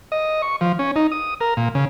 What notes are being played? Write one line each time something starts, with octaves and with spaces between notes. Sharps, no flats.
D#5
C#6
F3
C#4
D#4
D#6
A#4
A#2
C#3